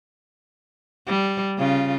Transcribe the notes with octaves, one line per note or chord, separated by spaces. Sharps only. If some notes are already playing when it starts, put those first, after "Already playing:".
G3
C#3 F4